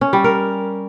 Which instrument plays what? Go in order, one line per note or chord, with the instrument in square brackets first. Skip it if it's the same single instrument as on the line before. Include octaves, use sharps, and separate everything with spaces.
[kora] C#4
G3
A#4